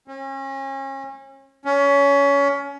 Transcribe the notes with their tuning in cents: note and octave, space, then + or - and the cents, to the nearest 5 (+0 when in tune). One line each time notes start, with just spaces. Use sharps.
C#4 -35
C#4 +25